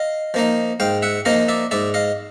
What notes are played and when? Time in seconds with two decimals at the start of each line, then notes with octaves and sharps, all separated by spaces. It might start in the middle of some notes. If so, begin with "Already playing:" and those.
Already playing: D#5 F5
0.34 F3 A#3 D#4
0.80 G#2 F5 G5
1.02 E5 F#5
1.25 F3 A#3 D#4 D#5 F5
1.48 D5 E5
1.71 G#2 D5 E5
1.94 D#5 F5